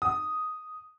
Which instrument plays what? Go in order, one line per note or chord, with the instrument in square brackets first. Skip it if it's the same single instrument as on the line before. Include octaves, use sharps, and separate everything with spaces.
[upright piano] D#6